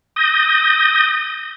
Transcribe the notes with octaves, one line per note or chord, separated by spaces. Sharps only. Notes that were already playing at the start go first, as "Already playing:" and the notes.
D#6 G6 A#6